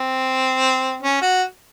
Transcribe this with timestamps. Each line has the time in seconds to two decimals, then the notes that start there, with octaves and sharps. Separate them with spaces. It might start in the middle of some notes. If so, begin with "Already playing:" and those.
Already playing: C4
1.02 C#4
1.21 F#4